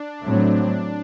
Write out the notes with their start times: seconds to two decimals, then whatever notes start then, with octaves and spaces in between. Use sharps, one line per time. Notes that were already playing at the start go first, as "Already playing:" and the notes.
Already playing: D4
0.24 A2 F#3 A3 C4